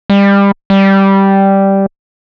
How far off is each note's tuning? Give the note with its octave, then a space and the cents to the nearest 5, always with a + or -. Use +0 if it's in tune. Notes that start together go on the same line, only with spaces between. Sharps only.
G3 +30
G3 -5